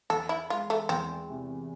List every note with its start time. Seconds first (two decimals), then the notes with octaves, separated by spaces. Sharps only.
0.10 E2 A4
0.29 E4
0.50 G#3 F4
0.70 A3
0.89 E2 C4
1.30 C3